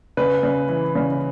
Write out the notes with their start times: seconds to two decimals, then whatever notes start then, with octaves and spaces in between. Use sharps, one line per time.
0.17 C#3 B4
0.43 C#3
0.69 E3
0.95 C#3